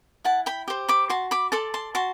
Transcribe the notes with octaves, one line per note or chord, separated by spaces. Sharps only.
E4 F#5 A5
G5 B5
G4 C5
B5 D6
F#4 A5 C6
B5 D6
A4 D5 A5 C6
A5 C6
F#4 A5 C6